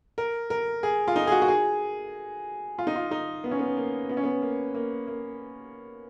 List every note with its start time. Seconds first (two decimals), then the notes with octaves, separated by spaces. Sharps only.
0.18 A#4
0.50 A#4
0.83 G#4
1.08 F4
1.16 D#4
1.27 G#4
1.32 F#4
1.42 F#4
1.48 G#4
2.78 F4
2.87 D#4
2.96 F4
3.11 D#4
3.44 B3
3.51 C#4
3.59 B3
3.77 A#3
4.09 B3
4.17 C#4
4.24 B3
4.42 A#3
4.75 A#3
5.07 A#3